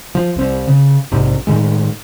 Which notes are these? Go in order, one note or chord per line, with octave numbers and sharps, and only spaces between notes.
F3
C2 C4
C#3
A#1 G#2 C3
A2 D#3 G#3